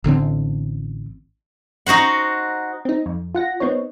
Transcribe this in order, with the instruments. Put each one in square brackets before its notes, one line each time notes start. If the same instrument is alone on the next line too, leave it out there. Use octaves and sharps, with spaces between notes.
[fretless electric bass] A1 D3 G3 C4
[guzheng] D#4 F#4 C5 F#5
[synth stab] C4 D#4
F2
F4 F#5 A#6
B3 C4 D#4 C#5